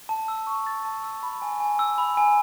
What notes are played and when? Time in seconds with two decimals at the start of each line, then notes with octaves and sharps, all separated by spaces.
0.09 A5
0.28 E6
0.47 C#6
0.67 A6
0.85 A5
1.03 E6
1.23 B5
1.42 G#5
1.60 G#5
1.79 E6
1.98 B5
2.17 G#5